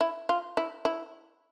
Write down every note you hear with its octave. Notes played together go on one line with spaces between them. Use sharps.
E4
F4
E4
E4